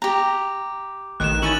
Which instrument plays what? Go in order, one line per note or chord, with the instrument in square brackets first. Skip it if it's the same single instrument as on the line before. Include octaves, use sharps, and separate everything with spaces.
[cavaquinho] G4 A#5
[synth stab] A1 D#3 [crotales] F#6 E7
[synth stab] C#4 D#4 E4 [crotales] A6 D#7 F#7